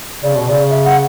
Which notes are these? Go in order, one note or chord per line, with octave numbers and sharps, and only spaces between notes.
C#3 D5
B2
C#3 D5
E5
F#5